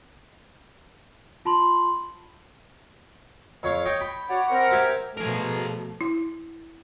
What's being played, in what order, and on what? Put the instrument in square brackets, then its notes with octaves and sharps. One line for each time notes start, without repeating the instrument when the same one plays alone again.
[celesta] F4 A5 B5 C6 F#7
[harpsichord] F2 C#5 F5
C#5 D#5 G5
G5 B5
[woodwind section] F#4 C#5 D5 [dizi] F#5
[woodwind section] C4 A#4
[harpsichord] G4 E5 G#5
[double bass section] B2 F3 A3 [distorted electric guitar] G#4 A#4
[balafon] E4